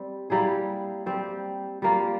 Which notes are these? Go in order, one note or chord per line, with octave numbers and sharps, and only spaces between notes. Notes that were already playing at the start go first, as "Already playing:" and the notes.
Already playing: G3 C4
G3 A#3 E4 G#4
G3 C4 G4
G3 A#3 F4